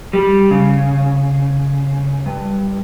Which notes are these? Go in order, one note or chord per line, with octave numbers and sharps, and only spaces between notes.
G3
C#3
G2